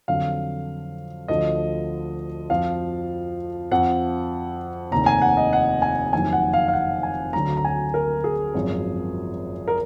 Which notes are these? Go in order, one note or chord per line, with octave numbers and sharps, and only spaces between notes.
F2 D3 F#3 F5
D2 D3 F3 D#5
F2 F3 F5
F2 F3 F#5
F1 D#2 D#3 A#5
G#5
F#5
D#5
F#5
G#5
F#1 F2 D#3 F#3 G#5
F#5
F5
F5
F#5
G#5
D2 D3 F#3 A#5
A#5
G#5
A#4
G#4
G#1 F#2 F3
A#4